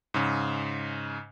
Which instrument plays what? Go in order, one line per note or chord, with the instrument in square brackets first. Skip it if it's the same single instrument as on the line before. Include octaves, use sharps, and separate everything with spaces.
[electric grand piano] G#2 C#3